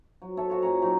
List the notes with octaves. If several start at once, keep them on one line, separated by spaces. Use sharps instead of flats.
F#3
A4 C#5 E5
F#4 G#4 C#5
A#2 C#4 A#5
F#3 C4 D#4 G4